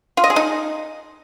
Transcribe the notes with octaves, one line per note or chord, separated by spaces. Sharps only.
F4
D#5
G#4
D#4